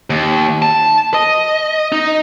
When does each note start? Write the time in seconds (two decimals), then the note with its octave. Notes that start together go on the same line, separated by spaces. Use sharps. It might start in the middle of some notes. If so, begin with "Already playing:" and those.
0.10 D#2
0.62 A5
1.14 D#5
1.92 D#4